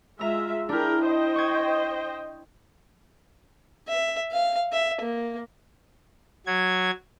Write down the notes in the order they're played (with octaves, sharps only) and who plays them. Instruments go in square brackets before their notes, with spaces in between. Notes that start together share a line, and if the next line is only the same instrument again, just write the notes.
[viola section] G#3 F4 E5 [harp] A#5 E6
[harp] D4 E4 [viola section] G#4 A#4 G5
[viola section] C5 D#5 G5
[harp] C#6 G#6
[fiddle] E5
F5
E5
A#3
[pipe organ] F#3 G#6